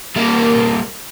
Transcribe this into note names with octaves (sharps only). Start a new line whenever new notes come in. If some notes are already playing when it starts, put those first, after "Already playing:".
G3 A#3